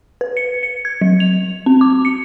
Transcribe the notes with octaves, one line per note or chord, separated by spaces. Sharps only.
B4
C#7
C#7
G#6
F#3
F7
C4
D6
C#7